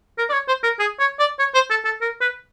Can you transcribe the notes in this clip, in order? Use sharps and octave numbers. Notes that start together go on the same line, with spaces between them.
A#4
D5
C#5
C5
A#4
G#4
C#5
D5
C#5
C5
A4
A4
A#4
B4